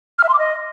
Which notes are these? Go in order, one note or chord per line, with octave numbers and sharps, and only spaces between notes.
F6
E5
C6
D6
D#5